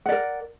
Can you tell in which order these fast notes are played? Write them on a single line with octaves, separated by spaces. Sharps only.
F#5 D5 A#4